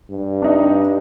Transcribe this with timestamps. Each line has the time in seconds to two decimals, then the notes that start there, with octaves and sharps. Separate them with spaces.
0.10 G2
0.42 D4 D#4